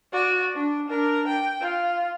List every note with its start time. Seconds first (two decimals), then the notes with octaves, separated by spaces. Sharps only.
0.13 F#4 D5
0.55 D4
0.88 D4 A#4
1.27 G5
1.61 F4